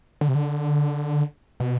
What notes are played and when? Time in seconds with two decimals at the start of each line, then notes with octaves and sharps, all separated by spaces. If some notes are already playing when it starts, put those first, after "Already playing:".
0.21 D3
0.28 C3
0.35 D3
1.60 B2